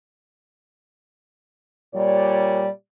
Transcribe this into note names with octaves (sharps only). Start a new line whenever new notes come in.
A#2 G3 C#5 D5